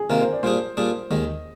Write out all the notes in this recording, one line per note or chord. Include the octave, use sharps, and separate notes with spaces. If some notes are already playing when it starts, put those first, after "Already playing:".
Already playing: G#4
C3 D#3 A#3 F4 A#4
C5
D5
A#2 G3 D4 G#4 C5
A#2 G3 D4 G#4
D#2 D#3 G#3 D#5